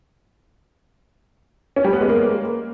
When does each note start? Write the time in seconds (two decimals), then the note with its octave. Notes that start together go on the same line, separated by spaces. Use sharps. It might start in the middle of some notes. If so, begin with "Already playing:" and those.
1.76 C#4
1.85 G3
1.93 B3
2.01 G#3
2.09 A#3